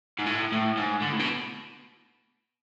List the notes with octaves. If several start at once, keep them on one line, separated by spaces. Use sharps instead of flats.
G#2
A2
A2
G#2
D3
A2
B2